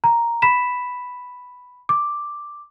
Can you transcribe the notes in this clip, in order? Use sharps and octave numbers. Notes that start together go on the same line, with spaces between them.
A#5
B5 B6 E7
D6